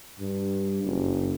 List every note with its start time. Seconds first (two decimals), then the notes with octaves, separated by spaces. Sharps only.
0.19 G2
0.84 F#1